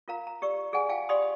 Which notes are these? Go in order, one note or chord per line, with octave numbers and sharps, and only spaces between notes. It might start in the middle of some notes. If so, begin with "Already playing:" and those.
F4 A#4 F5 A#5
A#5
G4 D5 C#6 E6
F#4 G#4 D5 F#5 G#5
F4 F5 G5 A5
G4 D5 F5 B5 C6 D#6